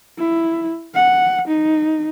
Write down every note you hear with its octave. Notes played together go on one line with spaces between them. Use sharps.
E4
F#5
D#4